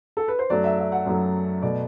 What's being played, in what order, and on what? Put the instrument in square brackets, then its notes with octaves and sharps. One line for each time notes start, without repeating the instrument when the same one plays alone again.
[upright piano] A4
B4
C5
F#2 F#3 A3 D5
E5
E5
F#5
F#2 F#3 A3
B2 A3 D5